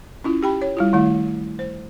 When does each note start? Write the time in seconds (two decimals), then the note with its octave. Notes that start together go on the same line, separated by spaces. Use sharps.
0.24 C#4 E4 F4
0.43 G4 G5 B5
0.62 C#5
0.77 G3 E4 F4
0.93 D#3 A3 E4
1.59 C5